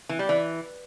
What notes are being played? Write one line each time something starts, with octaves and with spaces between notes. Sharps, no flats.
E3
G3
E3